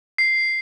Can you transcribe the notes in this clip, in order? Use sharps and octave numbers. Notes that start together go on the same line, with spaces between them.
C7